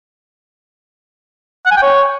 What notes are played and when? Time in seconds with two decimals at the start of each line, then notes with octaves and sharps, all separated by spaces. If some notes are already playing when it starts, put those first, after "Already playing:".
1.66 F#5
1.71 G#5
1.77 G5
1.82 C#5